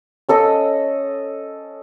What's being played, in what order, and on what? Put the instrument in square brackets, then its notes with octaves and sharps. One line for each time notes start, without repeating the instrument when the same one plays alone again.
[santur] C#4 A4 D#5 E6